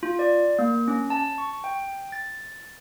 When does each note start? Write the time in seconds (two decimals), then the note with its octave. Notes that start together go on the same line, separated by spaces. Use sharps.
0.03 F4
0.19 D5
0.59 A#3
0.88 C#4
1.10 A5
1.38 C#6
1.64 G5
2.12 A6